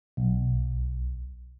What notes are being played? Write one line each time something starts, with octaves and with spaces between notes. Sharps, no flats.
B1